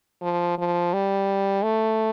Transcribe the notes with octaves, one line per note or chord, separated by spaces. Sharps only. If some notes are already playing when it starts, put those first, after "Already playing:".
F3
F3
G3
A3